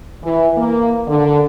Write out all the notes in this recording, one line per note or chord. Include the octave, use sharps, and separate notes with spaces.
E3
A#3
D3